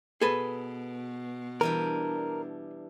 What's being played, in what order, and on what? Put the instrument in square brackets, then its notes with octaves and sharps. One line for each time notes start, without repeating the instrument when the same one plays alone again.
[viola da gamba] B2 [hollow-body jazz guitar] G#4 A4 B4
[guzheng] E3 G3 D4 [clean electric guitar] A#4